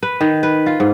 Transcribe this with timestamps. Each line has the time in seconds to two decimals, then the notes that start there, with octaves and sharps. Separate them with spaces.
0.03 B4
0.21 D#3
0.43 B4
0.66 F4
0.80 G#2